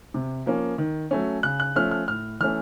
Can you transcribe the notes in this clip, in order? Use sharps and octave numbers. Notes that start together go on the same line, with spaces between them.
C3
F3 A#3 C#4
D#3
F#3 A3 C#4
C#3 F#6
F#6
F3 A3 C#4 F6
F6
A2 F6
E3 A3 C#4 F6